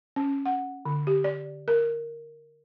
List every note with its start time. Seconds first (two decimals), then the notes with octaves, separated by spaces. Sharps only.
0.16 C#4
0.46 F#5
0.85 D3
1.07 G4
1.24 D5
1.68 A#4